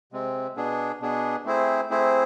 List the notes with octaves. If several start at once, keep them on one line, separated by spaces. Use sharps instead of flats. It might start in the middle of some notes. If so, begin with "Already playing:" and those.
C3 G#3 C4
B2 B3 D4 G#4
B2 B3 D4 G#4
A3 C4 E4 G#4 C5
A3 C4 E4 G#4 C5